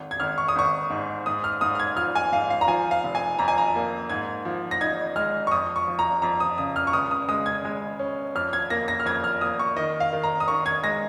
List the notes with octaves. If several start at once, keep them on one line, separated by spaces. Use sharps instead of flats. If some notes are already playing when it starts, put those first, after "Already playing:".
Already playing: G#1
G#6
G#1 F6
C#6
D#6
G#1 C#6
G#2
G#2 D#6
F6
G#2 D#6
F6
G#6
F3 F6
G#5
G#2 F5
F5
A#5
F3 G#5
F5
F1
G#5
F2 A#5
G#5
A#5
A#3
G#2 G#6
F3
A#6
D#4 G#6
G#3 F6
C#6
F2 D#6
C#6
F3
A#5
F2 A#5
D#6
C#3 D#6
F6
C#6
C#2 D#6
D#6
G#3 D#6
G#6
G#3
C#4
F2 F6
G#6
A#3 A#6
A#6
F6
F2 G#6
F6
A#3 D#6
C#6
D#3 D#5
F5
D#3
A#5
D#6
D#3 C#6
G#6
G#3 A#6